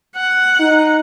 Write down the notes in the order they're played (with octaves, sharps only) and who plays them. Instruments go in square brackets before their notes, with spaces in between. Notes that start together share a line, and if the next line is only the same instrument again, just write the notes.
[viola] F#5
[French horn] D#4